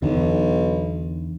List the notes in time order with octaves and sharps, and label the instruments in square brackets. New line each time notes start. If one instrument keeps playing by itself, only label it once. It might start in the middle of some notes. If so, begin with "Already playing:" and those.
[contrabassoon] B1 [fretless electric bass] E2 D3